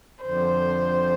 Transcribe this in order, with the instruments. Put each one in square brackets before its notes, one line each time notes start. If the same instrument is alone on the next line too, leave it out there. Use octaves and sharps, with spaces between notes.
[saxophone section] F2 D3 F3 [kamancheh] C5